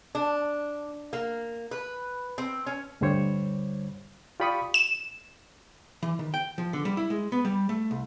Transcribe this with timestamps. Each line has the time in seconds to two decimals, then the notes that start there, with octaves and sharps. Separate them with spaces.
0.15 D4
1.13 A#3
1.71 B4
2.38 C4
2.66 C#4
3.01 D2 G2 D3 G3 C5 C#5
4.40 F4 G4 D5 B5 C#6 D#6
4.74 E7
6.03 E3
6.19 D#3
6.34 G5
6.58 F3
6.73 D3
6.85 G3
6.97 E4
7.10 G#3
7.32 B3
7.45 G3
7.69 A3
7.91 C2